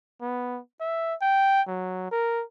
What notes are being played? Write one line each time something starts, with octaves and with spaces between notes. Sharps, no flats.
B3
E5
G5
F#3
A#4